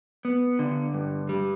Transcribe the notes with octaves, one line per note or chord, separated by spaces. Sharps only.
B3
D3
G2
G3